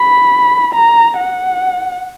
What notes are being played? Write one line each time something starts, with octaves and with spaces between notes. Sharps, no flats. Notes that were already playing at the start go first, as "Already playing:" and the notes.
Already playing: B5
A#5
F#5